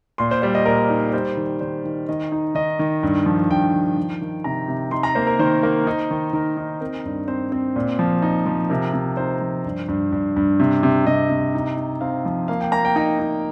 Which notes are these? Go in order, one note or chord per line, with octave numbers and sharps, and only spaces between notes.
A#2 C6
C5
G3 C5
D#5
A#2 A#4
D#4
G3 C5
D#3
D#3 C5
D#3
D#3 D#5
D#4
D#3 D#5
D#3
G2
F3
G2 G5
F3
D#3
D#3
C3 A#5
C3
D#4 C6
A#5
A#3 C5
A#4
D#3 C5
A#3
D#4
D#3
D#3 A#4
D#4
C4 A#4
G2
C4 C5
C4
A#2
F3
D#4
F3
C3 A#4
C3
D#4 C5
F3
G2
G2
G2
G2
C3
C3
C3 D#5
C3
D#4
D#4
C4 F5
F3
A#3 F5
G5
A#3 A#5
G5
D#4 G5
D#4